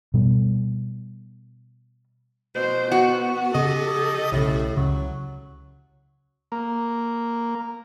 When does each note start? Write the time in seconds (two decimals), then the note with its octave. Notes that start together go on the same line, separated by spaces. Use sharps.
0.14 B2 G3 B3
2.56 B2 C5
2.92 B3 F#4
3.55 C#3 G4 A4 D#5
4.32 B1 A2 C#3
4.77 C#2 C#3 F#3
6.52 A#3